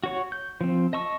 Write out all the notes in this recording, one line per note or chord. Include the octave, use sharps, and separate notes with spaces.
F#4 C#5 C#6
G6
F3 C4
D#5 A5 C#6 E6